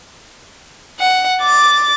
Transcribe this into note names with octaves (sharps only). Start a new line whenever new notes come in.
F#5
D6 A6